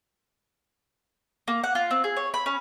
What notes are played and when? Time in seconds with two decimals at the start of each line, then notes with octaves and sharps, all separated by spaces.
1.48 A#3
1.64 F#5
1.75 F4
1.91 C4
2.04 G#4
2.16 C#5
2.34 B5
2.46 C#4